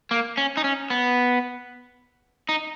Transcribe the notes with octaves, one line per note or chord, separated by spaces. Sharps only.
A#3
C#4
D#4
C#4
B3
D#4